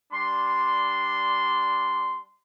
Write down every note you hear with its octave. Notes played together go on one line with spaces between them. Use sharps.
G3 D4 C6